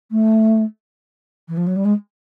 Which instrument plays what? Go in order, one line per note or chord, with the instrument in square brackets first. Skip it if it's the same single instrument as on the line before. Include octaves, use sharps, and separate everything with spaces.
[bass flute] A3
E3
F3
F#3
G3
G#3